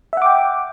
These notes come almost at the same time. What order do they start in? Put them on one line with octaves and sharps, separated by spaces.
E5 F#5 D6 G5